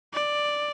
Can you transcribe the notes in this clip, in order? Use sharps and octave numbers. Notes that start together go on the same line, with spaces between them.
D5